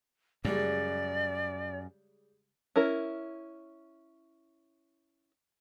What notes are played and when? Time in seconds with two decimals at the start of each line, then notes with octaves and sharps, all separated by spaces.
0.45 F#2 C#3 G3 G#3 D5
2.76 C#4 E4 A#4